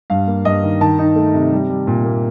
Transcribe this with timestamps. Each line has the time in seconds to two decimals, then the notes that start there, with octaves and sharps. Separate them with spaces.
0.10 G2 F5
0.27 A#3
0.45 G2 D#5
0.63 D#3
0.81 D#3 A5
0.99 D#4
1.16 A3
1.34 C3
1.52 G3
1.70 G3
1.87 A#2
2.05 A#3